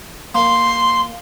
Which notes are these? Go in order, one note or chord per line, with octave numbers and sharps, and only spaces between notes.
A#3 C6